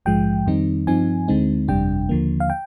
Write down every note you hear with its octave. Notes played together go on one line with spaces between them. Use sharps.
A#1 G#2 F3 G#3 G5
F2 D#3 G3 C4 D#4
G2 F3 C4 D#4 G#5
D2 D3 G#3 C4 D#4
G1 F2 C3 G3 D4 G5
D#2 D3 F3 A#3
F5
G5